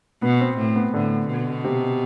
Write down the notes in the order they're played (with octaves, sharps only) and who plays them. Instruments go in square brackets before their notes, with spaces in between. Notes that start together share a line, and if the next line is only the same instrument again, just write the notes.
[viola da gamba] B2 [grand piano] B3
[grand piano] C4
[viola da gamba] A2
[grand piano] B3
[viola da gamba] A2 [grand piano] D3
[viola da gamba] B2
[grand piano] C3